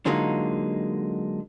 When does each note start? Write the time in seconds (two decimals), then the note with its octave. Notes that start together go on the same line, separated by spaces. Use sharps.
0.06 D3 F#3 G#3 A#3 D#4 F4